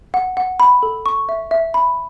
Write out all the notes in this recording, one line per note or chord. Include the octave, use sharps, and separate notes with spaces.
F#5
F#5
B5
A4
C#6
E5
E5
B5